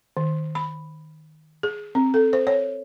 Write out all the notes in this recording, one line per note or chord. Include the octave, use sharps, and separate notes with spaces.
D#3
B5
G#4
C4
A4
C5
C#5